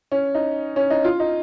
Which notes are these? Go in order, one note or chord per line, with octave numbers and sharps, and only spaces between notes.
C#4
D#4
C#4
D#4
F4
D#4